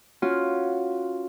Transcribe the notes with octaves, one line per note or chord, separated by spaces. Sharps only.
C#4 F4 F#4